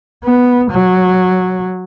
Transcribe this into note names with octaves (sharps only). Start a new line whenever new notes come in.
B3
F#3